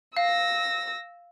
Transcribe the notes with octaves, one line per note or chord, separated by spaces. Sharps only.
F5 E6 A#6